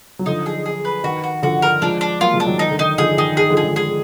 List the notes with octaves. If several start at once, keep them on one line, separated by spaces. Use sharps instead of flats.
F#3
D3 F3 D#4
G#4
G#4
B4
D#3 F#4
F#4
D3 F3 F#4
A#4
F3 G#3 D4
D4
F#3 A#3 F4
F3 G#3
D4
D#3 F#3
D#3 D#4
D3
D#3 D#4
D3 F3 G#4
D#3 D#4
D#3 G#4
D3 F3
G#4
F3 G#3
G#4